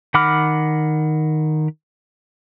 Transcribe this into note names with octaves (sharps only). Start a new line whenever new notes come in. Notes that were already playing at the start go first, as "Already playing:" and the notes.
D#3 F#5 B5 D6 F6